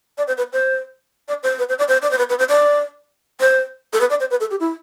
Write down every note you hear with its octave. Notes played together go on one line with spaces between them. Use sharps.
D5
C5
B4
C5
D5
C5
B4
C5
D5
C5
D5
C5
B4
B4
C5
D5
C5
A4
B4
D5
C5
B4
A4
G4
E4